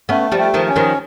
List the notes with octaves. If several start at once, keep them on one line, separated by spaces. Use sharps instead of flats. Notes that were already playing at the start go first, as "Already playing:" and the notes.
A3 B3 C#4
F3 G3
A3
D#3 F3
C#4
D#3 F3